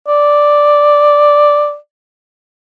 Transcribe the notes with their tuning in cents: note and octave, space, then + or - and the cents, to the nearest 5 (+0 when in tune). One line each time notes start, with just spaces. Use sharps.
D5 +0